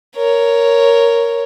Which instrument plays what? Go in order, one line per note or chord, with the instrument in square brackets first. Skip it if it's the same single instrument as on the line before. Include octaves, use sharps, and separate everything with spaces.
[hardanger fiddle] A#4 C#5